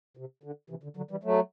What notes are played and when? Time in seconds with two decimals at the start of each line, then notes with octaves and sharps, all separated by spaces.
0.17 C3
0.43 D3
0.70 C3 E3
0.83 D3
0.97 D3 F#3
1.11 E3 G3
1.24 F#3 A3